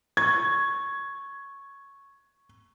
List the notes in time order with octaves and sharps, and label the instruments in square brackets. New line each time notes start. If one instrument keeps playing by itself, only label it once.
[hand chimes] C#6 [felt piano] G#6